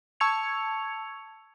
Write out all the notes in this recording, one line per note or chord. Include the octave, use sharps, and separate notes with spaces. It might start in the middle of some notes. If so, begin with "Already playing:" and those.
A5 C#6 E6 G#6 C#7 F7